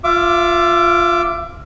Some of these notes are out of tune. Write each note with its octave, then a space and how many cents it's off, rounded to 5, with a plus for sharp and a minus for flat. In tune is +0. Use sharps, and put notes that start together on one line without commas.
F4 +0 E5 +30 D6 +0